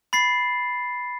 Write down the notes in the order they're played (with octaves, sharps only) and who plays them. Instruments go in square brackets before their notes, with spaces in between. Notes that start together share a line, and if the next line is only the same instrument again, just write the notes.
[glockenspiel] B5 A6 C7